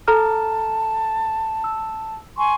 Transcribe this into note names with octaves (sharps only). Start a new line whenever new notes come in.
A4 A5 A#5 F6
E6
G#5 C6 C#6